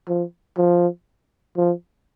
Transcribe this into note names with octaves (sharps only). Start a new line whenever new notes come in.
F3
F3
F3